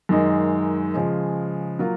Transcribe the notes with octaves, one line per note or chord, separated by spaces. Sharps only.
F#2 D#3 G#3 D#4
C#3 F3 G#3
F#3 A#3 F4